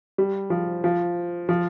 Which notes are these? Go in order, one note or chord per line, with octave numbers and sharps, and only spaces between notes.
G3
F3
F3
F3